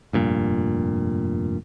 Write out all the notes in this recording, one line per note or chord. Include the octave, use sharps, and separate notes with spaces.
F1 G2 A#2